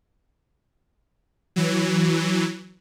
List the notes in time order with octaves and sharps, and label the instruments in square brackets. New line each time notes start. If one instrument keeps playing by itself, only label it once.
[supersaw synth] E3 F#3